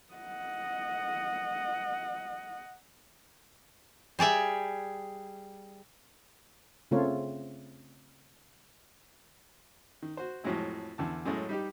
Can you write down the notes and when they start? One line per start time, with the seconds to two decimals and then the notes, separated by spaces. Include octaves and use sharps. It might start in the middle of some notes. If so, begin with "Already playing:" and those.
0.14 D#5 F#5
4.19 G3 G#4 D5 E5
6.91 C#3 A3 C4 F4 C#5
10.02 D#3
10.17 F#4 C5
10.44 F2 A2 F#3 G#3 E4
10.98 E2 D3 A5
11.26 F#2 A2 G#3 A3 C#4
11.49 G3 D#4 G4